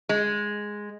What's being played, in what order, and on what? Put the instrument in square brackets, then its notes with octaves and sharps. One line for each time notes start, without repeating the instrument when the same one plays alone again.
[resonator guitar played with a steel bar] G#3